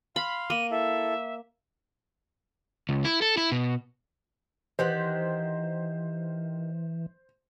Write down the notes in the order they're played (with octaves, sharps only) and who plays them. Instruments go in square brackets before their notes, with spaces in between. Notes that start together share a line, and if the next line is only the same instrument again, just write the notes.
[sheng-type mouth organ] F5 C6 [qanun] B5
[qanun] A#3 [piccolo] D#7
[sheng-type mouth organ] E4 A4 [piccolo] E5
[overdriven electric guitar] C#2
E4
A4
E4
B2
[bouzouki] D#3 G4 F#5 [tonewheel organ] E3 [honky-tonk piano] C5